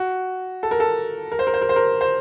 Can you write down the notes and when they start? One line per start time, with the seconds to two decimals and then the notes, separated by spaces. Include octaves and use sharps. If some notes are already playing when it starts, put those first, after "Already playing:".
Already playing: F#4
0.63 A4
0.71 A#4
0.80 A4
1.32 A#4
1.39 C5
1.47 A#4
1.54 C5
1.62 A#4
1.69 C5
1.76 A#4
2.01 C5